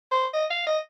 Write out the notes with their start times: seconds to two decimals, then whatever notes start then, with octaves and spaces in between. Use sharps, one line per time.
0.11 C5
0.33 D#5
0.50 F5
0.67 D#5